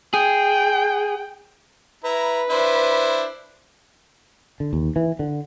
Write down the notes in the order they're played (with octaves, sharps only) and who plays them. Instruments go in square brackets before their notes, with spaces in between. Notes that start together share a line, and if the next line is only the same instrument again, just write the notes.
[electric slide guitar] G#4 [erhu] G5
[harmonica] E4 A#5 [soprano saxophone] B4
[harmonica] D4 E4 C5
[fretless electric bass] D3
D#2
E3
D3